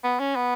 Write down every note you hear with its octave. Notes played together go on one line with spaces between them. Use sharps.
B3
C#4
B3